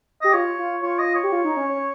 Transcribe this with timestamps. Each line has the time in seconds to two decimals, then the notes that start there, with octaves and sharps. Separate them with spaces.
0.22 G4 D#5
0.33 F4 C#5
0.59 F4
0.82 F4 C#5
0.99 D#5
1.15 C#5
1.23 G4
1.32 F4
1.45 D#4
1.57 C#4
1.69 C#4